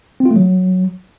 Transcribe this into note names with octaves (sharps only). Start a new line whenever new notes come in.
C4
F4
A3
F#3